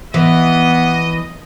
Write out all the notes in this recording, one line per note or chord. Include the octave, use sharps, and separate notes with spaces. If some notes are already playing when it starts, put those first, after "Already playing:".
E3 B3 D#5